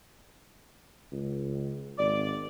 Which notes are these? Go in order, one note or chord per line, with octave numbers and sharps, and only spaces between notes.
C#2
G#1 D5